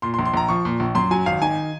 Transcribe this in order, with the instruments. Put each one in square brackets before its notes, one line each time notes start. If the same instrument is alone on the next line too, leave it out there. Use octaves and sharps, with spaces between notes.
[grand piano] A#2 C6
C6
A#1
C6
A#1 A#5
F3 C#6
A#2
A#1
F#2 C6
F#3 G#5
G#1 F5
D#3 G#5